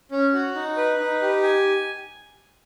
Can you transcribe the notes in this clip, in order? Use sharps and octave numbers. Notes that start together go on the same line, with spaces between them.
C#4
F#4
D#4
B4
D#4
G4
G#5